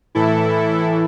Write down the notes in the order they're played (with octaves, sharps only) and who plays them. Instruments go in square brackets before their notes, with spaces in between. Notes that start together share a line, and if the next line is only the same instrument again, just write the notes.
[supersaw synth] A2 E3 E4 A4